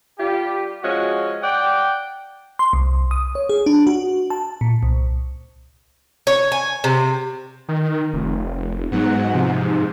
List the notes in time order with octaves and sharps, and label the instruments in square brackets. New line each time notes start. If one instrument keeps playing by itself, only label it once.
[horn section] G3 F4 G4
F3 G#3 C#4 F#4
D5 F#5 G5
[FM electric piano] C6
C2
D#6
C#5
G#4
D4
F#4
A5
A#2
C2
[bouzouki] C#5
G#5
C3
[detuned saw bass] D#3
F1
[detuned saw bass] G#2 [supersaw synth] F#3 B3 F#5
[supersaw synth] C3 F3